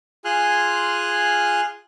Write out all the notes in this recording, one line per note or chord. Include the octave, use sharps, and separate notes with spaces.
F4 G#4 G#5 C6 F6 F#6